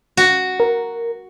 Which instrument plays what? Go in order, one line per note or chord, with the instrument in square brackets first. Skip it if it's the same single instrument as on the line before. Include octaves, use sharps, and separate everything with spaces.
[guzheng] F#4
[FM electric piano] A#4